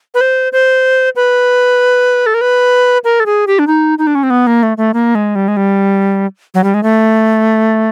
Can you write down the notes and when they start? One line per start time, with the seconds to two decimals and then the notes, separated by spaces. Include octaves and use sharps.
0.14 B4
0.21 C5
0.52 C5
1.16 B4
2.26 A4
2.34 A#4
2.41 B4
3.04 A#4
3.20 A4
3.26 G#4
3.47 G4
3.59 D4
3.67 D#4
3.98 D#4
4.07 D4
4.15 C#4
4.23 C4
4.30 B3
4.47 A#3
4.63 A3
4.77 A3
4.94 A#3
5.15 G#3
5.35 G3
5.48 G#3
5.57 G3
6.54 F#3
6.64 G3
6.74 G#3
6.83 A3